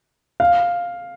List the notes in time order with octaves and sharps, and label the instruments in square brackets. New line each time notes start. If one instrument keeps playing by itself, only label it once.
[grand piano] F5